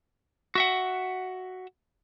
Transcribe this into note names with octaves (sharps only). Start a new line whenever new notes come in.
F#4 E5 F#5